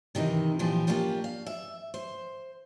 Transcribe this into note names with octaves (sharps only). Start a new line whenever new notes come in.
C3 D#3 E3 D#4
A#2 E3 F3 G4
A#3 C#4 D4 F4 G4
F5
E5
C5